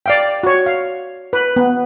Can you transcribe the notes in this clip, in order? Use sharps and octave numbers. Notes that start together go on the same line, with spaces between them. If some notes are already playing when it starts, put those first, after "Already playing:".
D5 F5 G5
F#4 C#5
F5
B4
B3